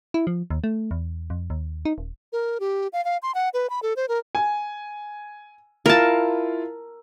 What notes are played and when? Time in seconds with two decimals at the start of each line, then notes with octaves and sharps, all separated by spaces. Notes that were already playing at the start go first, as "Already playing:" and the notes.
0.14 E4
0.27 F3
0.50 D#2
0.64 A3
0.91 E2
1.30 F2
1.50 D#2
1.85 D#4
1.98 D#1
2.33 A#4
2.60 G4
2.93 F5
3.05 F5
3.23 C6
3.35 F#5
3.54 B4
3.70 B5
3.83 A4
3.96 C5
4.09 A#4
4.35 G#5
5.86 E4 F4 A#4 F5 A5